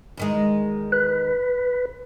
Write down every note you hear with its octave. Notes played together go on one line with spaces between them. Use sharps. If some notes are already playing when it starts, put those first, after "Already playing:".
E2 D#3 G#3
B4